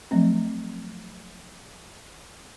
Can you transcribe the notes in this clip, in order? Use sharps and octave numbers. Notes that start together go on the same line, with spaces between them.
F3 F#3 A3 C4